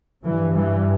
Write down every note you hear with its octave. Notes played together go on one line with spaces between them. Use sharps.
G2 E3
E3 G3